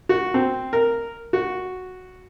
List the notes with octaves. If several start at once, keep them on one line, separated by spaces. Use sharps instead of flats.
F#4
C4
A#4
F#4